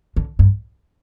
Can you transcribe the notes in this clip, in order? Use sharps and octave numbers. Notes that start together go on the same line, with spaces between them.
D3
G2